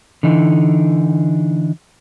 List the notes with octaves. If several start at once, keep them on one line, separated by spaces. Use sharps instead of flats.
D3 E3 D#4